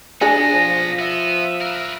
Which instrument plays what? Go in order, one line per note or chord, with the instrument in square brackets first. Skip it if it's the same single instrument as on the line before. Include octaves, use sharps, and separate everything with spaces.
[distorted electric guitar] B1 B3 [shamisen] D4 G#4 [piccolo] A#6
[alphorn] F3
[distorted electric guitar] B3 [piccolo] E5
[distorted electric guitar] A#4 B4